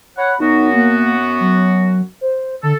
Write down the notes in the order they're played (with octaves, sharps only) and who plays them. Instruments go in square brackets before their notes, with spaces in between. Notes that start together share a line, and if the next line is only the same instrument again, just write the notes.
[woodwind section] C#5 F#5 [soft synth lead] B5
[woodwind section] F#2 B3 F#4 [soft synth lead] D#4
[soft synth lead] A#3
F#3
C5
[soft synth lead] D3 [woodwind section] A4